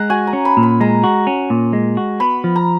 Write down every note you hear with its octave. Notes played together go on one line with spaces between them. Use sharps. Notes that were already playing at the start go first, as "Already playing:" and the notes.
Already playing: G#3 F#5 A#5
F#4 G#5
A#5
C#4
B5
A#2
B5
G#3 A#5
F#4
C#4
A#2
G#3
F#4
B3 B5
F3
A#5